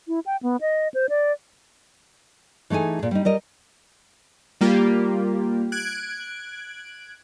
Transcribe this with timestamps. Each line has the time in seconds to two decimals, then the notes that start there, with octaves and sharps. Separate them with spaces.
0.08 E4
0.26 G5
0.43 B3
0.61 D#5
0.94 C5
1.09 D5
2.70 E3 A3 D#4 G#4 G#5
2.99 A#2 G#4
3.11 G3 D#4
3.25 G3 A#4 D#5
4.61 G3 A#3 F4 G4
5.72 F#6 G#6 D7